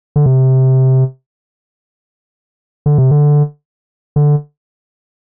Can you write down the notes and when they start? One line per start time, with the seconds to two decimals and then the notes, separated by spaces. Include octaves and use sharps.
0.16 D3
0.26 C3
2.86 D3
2.98 C3
3.11 D3
4.16 D3